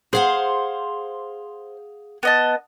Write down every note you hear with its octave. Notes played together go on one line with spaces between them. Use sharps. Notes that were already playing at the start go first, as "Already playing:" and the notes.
G#4 C5 F5 F#5
B3 D#5 A5